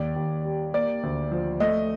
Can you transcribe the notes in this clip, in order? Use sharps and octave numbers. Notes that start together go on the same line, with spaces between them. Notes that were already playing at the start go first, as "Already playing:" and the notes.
Already playing: D#2 D5
D#2
G3
A#3 D5
D2
F3
A3 D#5